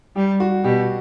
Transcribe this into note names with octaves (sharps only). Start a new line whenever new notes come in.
G3 G4
F#4
B2 G4